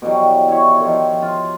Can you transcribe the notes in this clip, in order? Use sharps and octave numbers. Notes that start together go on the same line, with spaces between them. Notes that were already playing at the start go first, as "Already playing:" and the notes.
B2 E3 F#3 G3
E4 C#5
D#3 F3
F4